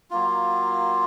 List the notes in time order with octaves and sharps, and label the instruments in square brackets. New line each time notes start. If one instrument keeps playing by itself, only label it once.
[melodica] F#3 A#3 F4